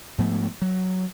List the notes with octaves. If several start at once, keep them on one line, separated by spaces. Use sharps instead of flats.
G#2 F3 A3 B3
F#3